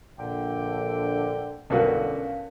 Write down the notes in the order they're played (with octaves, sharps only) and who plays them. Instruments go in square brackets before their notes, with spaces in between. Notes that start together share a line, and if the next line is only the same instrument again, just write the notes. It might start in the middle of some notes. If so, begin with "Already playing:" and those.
[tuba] A#1 [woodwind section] D3 G5
[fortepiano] B1 G2 F#4 [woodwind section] D3 [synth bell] C#4 A#4 F5